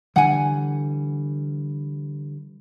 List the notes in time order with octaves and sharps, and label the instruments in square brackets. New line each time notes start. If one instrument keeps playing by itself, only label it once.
[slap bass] D3 E3 G3 [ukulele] F#5 G#5